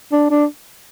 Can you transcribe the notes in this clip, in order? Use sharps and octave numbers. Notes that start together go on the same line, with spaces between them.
D4
D4